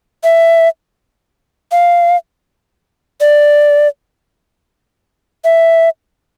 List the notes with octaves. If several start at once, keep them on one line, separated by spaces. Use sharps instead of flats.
E5
F5
D5
E5